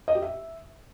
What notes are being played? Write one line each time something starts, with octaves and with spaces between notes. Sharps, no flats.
D#5
G4
E5